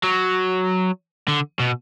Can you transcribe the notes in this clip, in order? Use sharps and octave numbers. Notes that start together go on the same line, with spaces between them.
F#3
D3
B2